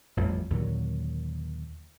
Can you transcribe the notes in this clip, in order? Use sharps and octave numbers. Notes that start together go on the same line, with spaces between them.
A1 F2 E3 G3
D#2 A#2 D3 F#3